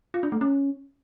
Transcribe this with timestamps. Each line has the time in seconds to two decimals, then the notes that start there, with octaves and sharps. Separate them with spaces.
0.14 F4
0.23 D4
0.32 A3
0.41 C#4